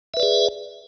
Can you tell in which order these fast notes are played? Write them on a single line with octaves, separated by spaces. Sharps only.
E5 B4 D5 G#4